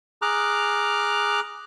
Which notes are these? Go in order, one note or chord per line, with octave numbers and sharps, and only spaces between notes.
G#4 A#5 D6 F6 F#6